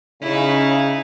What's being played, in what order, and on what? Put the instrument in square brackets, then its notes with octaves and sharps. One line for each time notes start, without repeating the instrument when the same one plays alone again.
[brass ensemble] C#3 [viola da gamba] D#4 E4